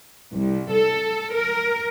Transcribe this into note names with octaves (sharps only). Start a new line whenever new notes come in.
C2
A4
A#4